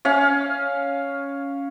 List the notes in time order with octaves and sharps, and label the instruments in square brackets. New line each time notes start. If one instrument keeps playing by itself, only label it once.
[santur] C#4 F5